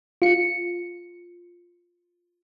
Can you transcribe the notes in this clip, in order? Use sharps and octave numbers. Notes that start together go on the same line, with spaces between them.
F4 C#7